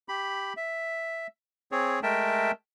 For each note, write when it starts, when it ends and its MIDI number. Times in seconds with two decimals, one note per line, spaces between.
0.09 0.53 67
0.09 0.53 83
0.57 1.27 76
1.72 2.00 60
1.72 2.00 68
1.72 2.00 73
2.03 2.51 56
2.03 2.51 57
2.03 2.51 70
2.03 2.51 76
2.03 2.51 79
2.03 2.51 81